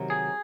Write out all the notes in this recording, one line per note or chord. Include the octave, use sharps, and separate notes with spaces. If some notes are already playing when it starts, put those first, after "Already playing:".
Already playing: C3 D#3 F#3
G#4